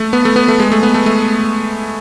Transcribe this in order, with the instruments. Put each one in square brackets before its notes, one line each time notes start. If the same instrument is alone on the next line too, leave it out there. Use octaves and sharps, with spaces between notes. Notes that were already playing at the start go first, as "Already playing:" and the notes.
Already playing: [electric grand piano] A3
B3
A3
B3
A3
G#3
A3
B3
A3
A3